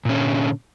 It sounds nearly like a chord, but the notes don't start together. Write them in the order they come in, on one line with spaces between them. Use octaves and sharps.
A#2 C#4 D3